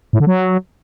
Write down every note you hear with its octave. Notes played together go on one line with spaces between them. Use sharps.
A2
D3
F#3